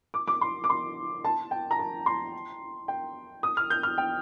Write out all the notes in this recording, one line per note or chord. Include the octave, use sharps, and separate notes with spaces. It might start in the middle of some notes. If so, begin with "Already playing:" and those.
D6
D6
C6
D6
C6
A5
G5
A#5
A5
C6
G5
D#6
F6
G6
F6
G5